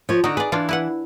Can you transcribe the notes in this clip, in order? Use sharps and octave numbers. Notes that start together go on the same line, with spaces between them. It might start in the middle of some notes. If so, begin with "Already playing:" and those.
F3 C#5
D3 D#4 F#4
G#4 B4 D5
E3 D4 F4
E4 B4 F#5